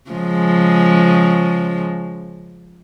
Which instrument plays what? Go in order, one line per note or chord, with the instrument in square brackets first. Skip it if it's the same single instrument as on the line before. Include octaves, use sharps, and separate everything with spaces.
[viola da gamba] C#3 F3 G#3